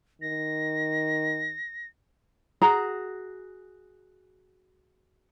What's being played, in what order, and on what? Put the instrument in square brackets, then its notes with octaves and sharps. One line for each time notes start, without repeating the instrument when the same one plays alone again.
[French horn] D#3 [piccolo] A#6
[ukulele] F#4 G#4 A#5